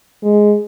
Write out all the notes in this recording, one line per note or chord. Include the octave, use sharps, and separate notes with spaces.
G#3